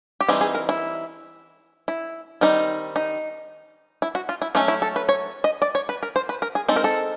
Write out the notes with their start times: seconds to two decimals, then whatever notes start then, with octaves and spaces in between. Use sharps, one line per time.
0.20 G4
0.28 E3 G3 C4 D#4 G#4
0.41 G#4
0.55 A#4
0.69 E4
1.88 E4
2.41 D#3 G3 C4 D#4
2.96 D#4
4.02 E4
4.15 F#4
4.29 F4
4.42 E4
4.55 F#3 A3 C#4 D#4
4.68 E4
4.82 A4
4.96 B4
5.09 C#5
5.44 D#5
5.62 D5
5.75 C#5
5.89 B4
6.03 A#4
6.16 C5
6.29 B4
6.42 A#4
6.55 G#4
6.68 G#3 C4 D#4 A4
6.76 A#4
6.84 A4